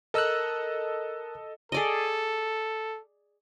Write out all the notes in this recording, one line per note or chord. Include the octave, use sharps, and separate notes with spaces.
A4 A#4 D#5 E6 F#6
G#4 A4 D5 D#5